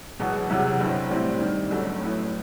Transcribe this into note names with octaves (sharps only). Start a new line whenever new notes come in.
E1 E2 B2 F#3 B3
E2 C3 F#3 B3 E4
G1 G2 F#3 C4 E4
A2 G3 C4 E4
G2 D#3 G3
G1 F#2 F#3 A3
A2 F#3 B3 E4